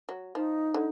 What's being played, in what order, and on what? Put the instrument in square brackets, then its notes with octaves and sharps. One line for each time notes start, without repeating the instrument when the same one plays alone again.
[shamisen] F#3
[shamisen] F3 [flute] D#4
[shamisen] D3